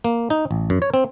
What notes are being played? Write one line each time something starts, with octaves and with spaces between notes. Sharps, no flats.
A#3
D#4
A1
F#2
C#5
C4